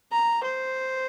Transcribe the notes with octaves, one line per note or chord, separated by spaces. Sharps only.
A#5
C5